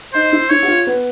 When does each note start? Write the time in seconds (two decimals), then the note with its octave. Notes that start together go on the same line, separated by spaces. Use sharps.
0.14 D#4 C5
0.32 E4
0.50 E4 C#5
0.63 F#4
0.68 F4
0.87 B3